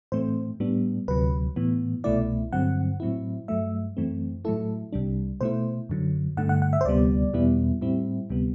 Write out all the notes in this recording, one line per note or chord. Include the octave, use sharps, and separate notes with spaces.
A2 E3 A3 C4 C5
A2 G3 B3 D4
D2 C3 F#3 B4
A2 E3 B3
C2 B2 A3 E4 D5
G2 D3 F#3 C4 F#5
A2 F#3 C4 E4
G2 F#3 A3 E5
F#2 E3 A3 C4
A2 F#3 A3 E4 A4
C2 C3 G3 D4
B2 A3 E4 C5
F#2 D3 F#3
G2 D3 A3 F#5
F#5
F#5
E5
C5
D2 C3 G3 B3 D5
E2 B2 G3 B3 E4
A2 G3 C4 E4
D2 C3 G3 B3